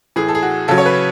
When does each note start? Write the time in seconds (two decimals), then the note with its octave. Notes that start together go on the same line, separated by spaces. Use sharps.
0.16 A2 E3 G#4
0.28 A4
0.35 G#4
0.43 F#4
0.68 C#3 F#3 A4
0.78 C#5
0.86 B4